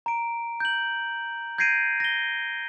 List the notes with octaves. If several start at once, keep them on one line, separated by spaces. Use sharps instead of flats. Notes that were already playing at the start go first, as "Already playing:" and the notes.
A#5 D7
G6 F#7
G6 G#6 A#6 C7 D7 D#7
A#6 G7